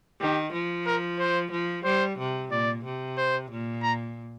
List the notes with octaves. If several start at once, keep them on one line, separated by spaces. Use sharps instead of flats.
D#3 G4
F3
A#4
C5
F3
G3 C5
C3
A#2 D5
C3
C5
A#2
A#5